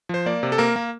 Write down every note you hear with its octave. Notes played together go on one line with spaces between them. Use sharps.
F3 C5
A#3 D5
C3
A4
A#3 A#4
A#3